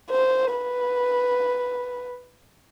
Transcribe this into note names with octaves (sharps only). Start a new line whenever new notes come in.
C5
B4